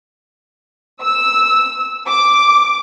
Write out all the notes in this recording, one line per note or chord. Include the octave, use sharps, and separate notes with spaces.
E6
D6